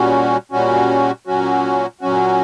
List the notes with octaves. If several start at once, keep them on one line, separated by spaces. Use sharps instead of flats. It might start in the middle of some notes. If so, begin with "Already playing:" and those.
Already playing: A#2 G3 C#4 F#4
A#2 G3 C#4 F#4
A#2 F#3 C#4 F#4
A#2 F#3 C#4 F#4